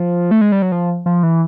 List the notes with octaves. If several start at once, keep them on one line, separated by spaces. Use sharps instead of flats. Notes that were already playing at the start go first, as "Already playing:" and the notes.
Already playing: F3
A3
G#3
G3
F#3
F3
F3
E3